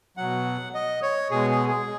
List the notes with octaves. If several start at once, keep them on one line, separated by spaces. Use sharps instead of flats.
B2 F#3 F#5
D#5
C#5
B2 G#3 G#4
G#4
G#4